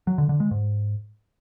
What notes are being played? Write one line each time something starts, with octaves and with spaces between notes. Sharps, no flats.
F#3
D3
D3
G#3
G#2